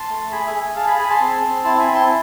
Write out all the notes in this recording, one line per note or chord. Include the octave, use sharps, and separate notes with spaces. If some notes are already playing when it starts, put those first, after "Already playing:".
Already playing: A5 C6
A3
G#4 G#5 B5
E5 G#5
G#4
G#4 F5 A5
G#5 B5
G#4 G#5 B5
A5 C6
C4
C4
E4 A5 C6
G#5 B5
C4
A5 C6